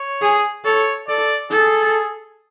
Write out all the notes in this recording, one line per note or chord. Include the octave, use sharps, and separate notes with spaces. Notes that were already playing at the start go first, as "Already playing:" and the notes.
Already playing: C#5
G#4
A4 C#5
A4 D5
G#4 A4